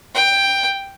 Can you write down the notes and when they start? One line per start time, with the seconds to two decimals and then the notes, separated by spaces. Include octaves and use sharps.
0.15 G5